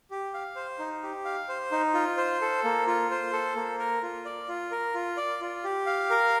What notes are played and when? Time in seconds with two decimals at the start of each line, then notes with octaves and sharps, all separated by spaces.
0.11 G4
0.34 F5
0.56 C5
0.79 D#4
1.03 G4
1.25 F5
1.49 C5
1.72 D#4
1.94 F4
2.17 C5
2.41 A4
2.64 A#3
2.87 F4
3.11 C5
3.33 A4
3.56 A#3
3.79 A#4
4.03 F4
4.25 D5
4.48 F4
4.71 A#4
4.94 F4
5.17 D5
5.41 F4
5.64 G4
5.86 F5
6.10 A#4